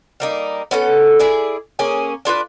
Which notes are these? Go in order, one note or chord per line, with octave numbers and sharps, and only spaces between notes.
G3 A#3 D#4
B3 C#4 A4
E4 G#4 D5
A#3 C#4 G#4 G#5
D4 F4 F#4 B4